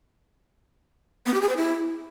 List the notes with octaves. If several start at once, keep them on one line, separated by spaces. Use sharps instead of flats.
B3
G4
G#4
C5
E4